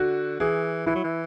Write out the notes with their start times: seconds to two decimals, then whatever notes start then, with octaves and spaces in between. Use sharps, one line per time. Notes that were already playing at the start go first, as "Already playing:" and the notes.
Already playing: D3 F#4
0.40 E3 G#4
0.86 E3 E4
0.95 F#3
1.04 E3